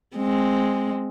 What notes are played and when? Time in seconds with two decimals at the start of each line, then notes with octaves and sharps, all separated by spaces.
0.17 G#3 C4